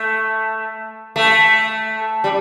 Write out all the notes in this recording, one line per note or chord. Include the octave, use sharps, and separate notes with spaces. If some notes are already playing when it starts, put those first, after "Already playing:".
Already playing: A3
A3
G3